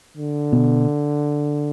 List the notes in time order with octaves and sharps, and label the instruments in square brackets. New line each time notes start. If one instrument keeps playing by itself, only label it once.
[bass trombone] D3
[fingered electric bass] B2 B3